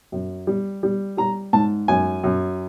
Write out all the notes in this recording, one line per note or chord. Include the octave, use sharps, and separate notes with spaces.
F#2
G3
G3
G3 A#5
G#2 A5
F#2 G#5
F#2